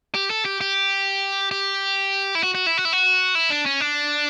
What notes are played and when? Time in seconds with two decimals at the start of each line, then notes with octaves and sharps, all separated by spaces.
0.15 G4
0.30 A4
0.45 G4
0.61 G4
1.51 G4
2.35 E4
2.43 F#4
2.55 F#4
2.66 E4
2.78 F#4
2.85 E4
2.93 F#4
3.35 E4
3.50 D4
3.66 C#4
3.80 D4